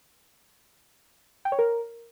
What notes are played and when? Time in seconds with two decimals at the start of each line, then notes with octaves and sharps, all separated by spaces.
1.45 G5
1.52 C#5
1.59 A#4